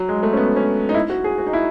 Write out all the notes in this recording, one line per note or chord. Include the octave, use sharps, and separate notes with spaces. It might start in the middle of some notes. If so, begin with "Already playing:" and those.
Already playing: F#3
G#3
A3
C#4
B3
C#4
D#4
E4
F#4
G#4
F#4
D#4
E4